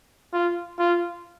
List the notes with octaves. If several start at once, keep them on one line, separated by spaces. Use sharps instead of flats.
F4
F4